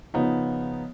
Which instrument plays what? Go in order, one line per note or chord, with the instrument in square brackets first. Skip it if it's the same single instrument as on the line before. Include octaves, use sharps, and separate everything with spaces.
[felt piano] C#3 F3 B3 D#4